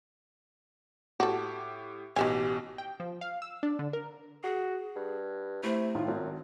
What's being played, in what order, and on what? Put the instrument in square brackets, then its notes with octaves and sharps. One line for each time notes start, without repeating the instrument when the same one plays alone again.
[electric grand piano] A2 G4 D6 [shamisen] F#4 A4
[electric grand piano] A1 B2 [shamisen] D#3 E5 G#5 [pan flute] G4
[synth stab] G5
F3
F5
E6
D4
D3
A#4
[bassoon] F#4 [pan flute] G#4
[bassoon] G2
[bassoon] C3 [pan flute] A3 [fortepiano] E4 C5
[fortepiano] A2 D#3 F4
[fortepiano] G#1 [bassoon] F#2